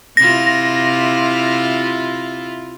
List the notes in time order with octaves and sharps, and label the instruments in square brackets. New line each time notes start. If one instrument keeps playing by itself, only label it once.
[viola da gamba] C3 E4 F4 [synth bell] A#6